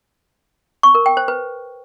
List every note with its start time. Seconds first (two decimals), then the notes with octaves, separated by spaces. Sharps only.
0.83 C#6
0.95 A#4
1.06 G5
1.17 C5
1.28 B4